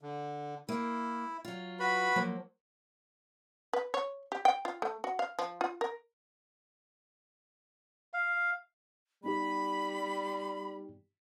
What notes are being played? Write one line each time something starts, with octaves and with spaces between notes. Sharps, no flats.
D3
A#3 E4
F#3 F4
F#4 B4 B5
F3 F#3 A#3
B4
C#5
G4
G5
F4
A3
F#4
F5
F3
F4
A#4
F5
G3 B3 D#4 G4 B5